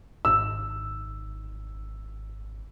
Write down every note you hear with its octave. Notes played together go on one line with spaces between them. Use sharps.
G#1 E6